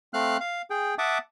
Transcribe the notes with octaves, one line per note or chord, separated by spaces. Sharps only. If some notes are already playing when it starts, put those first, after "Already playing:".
A3 C4 F5 F6 F#6
F5
G#4 G5
E5 F#5 A5 D6 D#6